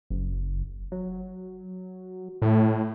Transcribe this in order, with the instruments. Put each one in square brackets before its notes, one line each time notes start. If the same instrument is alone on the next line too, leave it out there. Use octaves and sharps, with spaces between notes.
[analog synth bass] F#1
F#3
[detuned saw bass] A2